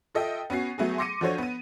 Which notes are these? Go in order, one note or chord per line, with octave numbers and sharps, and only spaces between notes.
F4 A4 D#5 E5 G5
B3 C#4 F#4 C7
F#3 A3 B3 F#4 G#4
C6 D6 A#6 C#7 D#7
F3 D4 F#4 A4 C5 C#5
B3 D#7